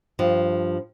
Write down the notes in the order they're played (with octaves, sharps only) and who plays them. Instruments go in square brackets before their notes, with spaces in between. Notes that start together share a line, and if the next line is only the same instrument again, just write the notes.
[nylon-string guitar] G2 F3